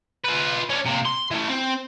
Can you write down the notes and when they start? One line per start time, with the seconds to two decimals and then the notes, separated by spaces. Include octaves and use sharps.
0.24 F4 B4
0.70 C#4 D4
0.86 C3 A#3
1.05 C6
1.31 E3 A3
1.50 C4